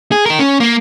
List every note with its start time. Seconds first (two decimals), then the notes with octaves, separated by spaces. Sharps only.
0.12 G#4
0.26 D#4 A#4
0.39 C#4
0.60 A#3